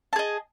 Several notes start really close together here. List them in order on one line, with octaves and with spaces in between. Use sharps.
A5 G#4 D#5